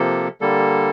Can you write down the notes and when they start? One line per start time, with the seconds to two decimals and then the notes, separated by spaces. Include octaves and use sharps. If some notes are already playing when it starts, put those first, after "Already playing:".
Already playing: C3 F3 A#3 A4
0.41 D3 G3 A#3 A4